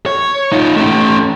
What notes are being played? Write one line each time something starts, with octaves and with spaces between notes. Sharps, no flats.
C#5
D#4 F4
A3 C#4